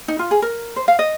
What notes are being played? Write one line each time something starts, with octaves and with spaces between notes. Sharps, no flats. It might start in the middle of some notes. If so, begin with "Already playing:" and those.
D#4
F4
G#4
A#4
C5
F5
D#5